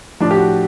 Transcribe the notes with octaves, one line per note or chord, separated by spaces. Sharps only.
A2 F3 D4
G4
F#4